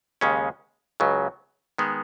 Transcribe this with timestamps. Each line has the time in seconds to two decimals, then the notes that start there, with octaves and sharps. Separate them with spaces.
0.21 D#2 C#3 G#3 C#4
1.00 C#2 C#3 F#3
1.78 D#3 G#3 B3